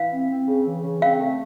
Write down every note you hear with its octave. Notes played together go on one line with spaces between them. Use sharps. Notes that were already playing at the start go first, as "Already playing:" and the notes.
Already playing: E3 F5
C4
C4
C#3
E3
C#3
C4 F5
A3